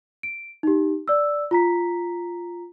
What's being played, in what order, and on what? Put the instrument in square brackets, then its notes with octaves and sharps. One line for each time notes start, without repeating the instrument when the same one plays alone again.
[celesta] D7
D#4 G4
D5 E6
F4 A#5 B6